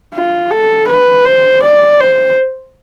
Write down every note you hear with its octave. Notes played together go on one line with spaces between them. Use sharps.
F4
A4
B4
C5
D5
C5